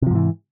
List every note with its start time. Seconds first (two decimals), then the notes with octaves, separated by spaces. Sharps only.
0.02 C3
0.07 F3
0.11 G#2
0.15 E3